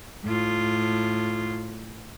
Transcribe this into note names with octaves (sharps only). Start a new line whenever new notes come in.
A2 F4